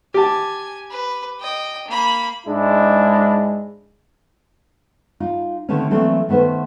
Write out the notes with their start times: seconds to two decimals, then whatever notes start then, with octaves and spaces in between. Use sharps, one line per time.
0.14 G4 G#5 A5
0.90 B4
1.40 D#5 G5
1.87 A#3 B5
2.47 G#2 G#3 D4 E4
5.20 D#4 F4
5.69 D3 D#3 A3 C4 C#4
5.90 E3 F#3 A3 A#3 C4 D4
6.29 D#3 A3 B3 C#4 C5